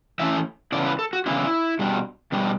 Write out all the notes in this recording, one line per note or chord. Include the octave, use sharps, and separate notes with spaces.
E3 A3 C#4 E5
C#3 E3 B3 D4 D5
B4
A4
F#4
C#3 E3 B3 D4 E4
B2 G3 D4
B2 G3 D4